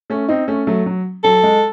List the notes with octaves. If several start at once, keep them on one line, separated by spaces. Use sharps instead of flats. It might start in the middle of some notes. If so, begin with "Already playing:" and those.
A3 C#4
C4 D#4
A3 C#4
F#3 A3
F#3
F#3 A4
G#3